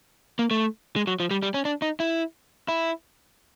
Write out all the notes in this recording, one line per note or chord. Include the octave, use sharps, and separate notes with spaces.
A#3
A3
G#3
F#3
F3
G3
G3
C#4
D4
D#4
E4
E4